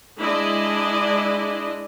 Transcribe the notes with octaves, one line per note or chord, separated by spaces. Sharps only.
G#3 D4 E4 D5 D#5